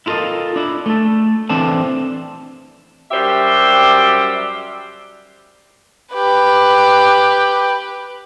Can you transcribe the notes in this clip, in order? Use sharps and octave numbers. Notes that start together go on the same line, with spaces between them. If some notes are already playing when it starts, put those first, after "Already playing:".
E4 F4 A4 A#4 D#5
D4 E4
A3 A4
E3 C4 D4 A4 A5
F#2 G3 G4 C5 E5
G4 B4